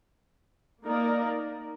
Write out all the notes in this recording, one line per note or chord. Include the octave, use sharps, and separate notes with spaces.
A#3 D#4 A#4 D5